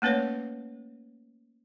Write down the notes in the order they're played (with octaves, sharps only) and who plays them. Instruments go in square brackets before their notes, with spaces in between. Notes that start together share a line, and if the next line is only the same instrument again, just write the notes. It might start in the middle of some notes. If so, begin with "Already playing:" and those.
[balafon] A3 A#3 C#4 B4 C#5